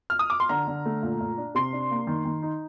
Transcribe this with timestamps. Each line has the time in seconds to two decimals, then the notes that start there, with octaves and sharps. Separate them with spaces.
0.10 F6
0.19 D#6
0.30 D6
0.40 C6
0.49 D3 A#5
0.67 D3
0.85 A3
1.03 A#2
1.20 A#2
1.38 D4
1.55 C3 C6
1.73 D4
1.91 A#3
2.07 D#3
2.25 D#3
2.42 D#4